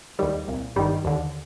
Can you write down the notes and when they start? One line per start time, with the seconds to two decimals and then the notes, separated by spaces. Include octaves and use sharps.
0.19 D#2 D#3 G3
0.48 C2 A#2
0.76 G1 G2 D#3 G3
1.05 D#2 D3